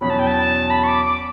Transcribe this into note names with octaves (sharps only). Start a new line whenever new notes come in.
E2 B2 F#3 C#4 B5
A5
G5
A5
B5
C#6
D6
D6